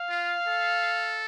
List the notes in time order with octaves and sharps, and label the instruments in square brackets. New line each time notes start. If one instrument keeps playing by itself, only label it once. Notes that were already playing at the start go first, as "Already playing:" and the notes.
Already playing: [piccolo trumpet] F5
[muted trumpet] F4
A4